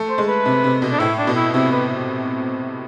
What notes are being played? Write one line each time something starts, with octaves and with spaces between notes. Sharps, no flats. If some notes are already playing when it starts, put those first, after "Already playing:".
Already playing: A3
C5
G#3
B4
C3
C3
B2
D4
A2 E4
D4
B2
E4
C3 E4
B4